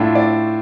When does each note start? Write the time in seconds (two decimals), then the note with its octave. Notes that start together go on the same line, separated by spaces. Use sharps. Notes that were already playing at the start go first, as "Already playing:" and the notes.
Already playing: A2 A3 D4 F4
0.15 D5